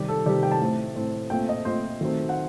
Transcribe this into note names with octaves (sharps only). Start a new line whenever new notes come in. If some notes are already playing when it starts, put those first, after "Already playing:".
Already playing: C3 D#3 G3 G4
A4
C3 D#3 G3 G4
G5
A5
A2 A3 C4
A2 A3 C4
A#2 A3 C4 G5
D#5
A#2 A3 C4 C5
D#3 F#3 A3 C4
F#5